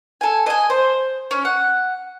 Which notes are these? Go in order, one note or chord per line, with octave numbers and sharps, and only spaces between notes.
A4 G#5
D#5 G#5
C5
C#4
F#5